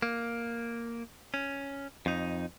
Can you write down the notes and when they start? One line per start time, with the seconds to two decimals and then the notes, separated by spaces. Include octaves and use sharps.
0.02 A#3
1.34 C#4
2.06 F2 D#4